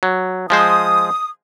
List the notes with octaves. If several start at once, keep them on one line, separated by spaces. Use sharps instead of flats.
F#3
F3 G#3 C5 D#6